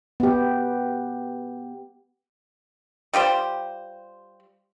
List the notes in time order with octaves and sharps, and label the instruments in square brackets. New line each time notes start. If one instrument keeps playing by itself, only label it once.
[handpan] B3 G4
[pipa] G3 F4 G4 C5